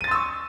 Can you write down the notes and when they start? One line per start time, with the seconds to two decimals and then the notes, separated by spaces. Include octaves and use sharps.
0.01 D#7
0.04 A6
0.08 C6
0.11 E6
0.15 C#6